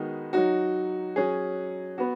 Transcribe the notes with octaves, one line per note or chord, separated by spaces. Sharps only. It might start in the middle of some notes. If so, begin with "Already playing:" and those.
Already playing: D#3 G#3 B3 D#4 F#4
F#3 D#4 F#4
F#3 C#4 G#4
B3 F#4